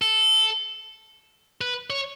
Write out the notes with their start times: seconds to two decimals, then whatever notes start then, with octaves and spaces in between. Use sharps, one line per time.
0.02 A4
1.61 B4
1.90 C#5